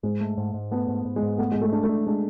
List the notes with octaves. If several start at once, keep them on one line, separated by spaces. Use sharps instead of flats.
G#2 G#3
A3
G#2
G#2
A3 B3
G#2
G#2
G#3
G#2
A3 B3
G#2 G#3
A3
D4
A3
D4
G#3 D4